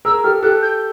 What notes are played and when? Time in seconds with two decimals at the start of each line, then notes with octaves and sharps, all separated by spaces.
0.05 G#4 A#4 E6
0.24 G4 A4 F6
0.43 G4 A4 F#6
0.62 G6